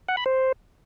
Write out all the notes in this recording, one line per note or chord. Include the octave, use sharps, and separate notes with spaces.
F#5
B5
C5